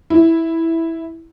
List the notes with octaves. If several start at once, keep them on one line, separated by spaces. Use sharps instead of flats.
E4